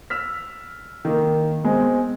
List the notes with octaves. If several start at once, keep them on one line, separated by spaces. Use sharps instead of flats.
E6 F6 B6
D#3 A#3
B2 G#3 C4